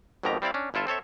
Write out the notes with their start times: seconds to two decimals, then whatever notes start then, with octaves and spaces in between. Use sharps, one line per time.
0.23 G#1 F2 B2 D#3 G4 A#5
0.42 G3 C4 E4 D5 F5
0.54 C#4 D4
0.74 G1 E4 F4 A4 E5
0.87 C4 A4 C#5 E5